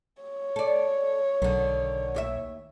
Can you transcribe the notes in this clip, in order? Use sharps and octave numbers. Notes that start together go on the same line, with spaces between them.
C#5
A4 D5
B1 D3 D#3
D#2 G4 E5